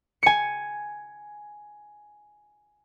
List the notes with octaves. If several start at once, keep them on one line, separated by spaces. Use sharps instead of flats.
G#5 C#7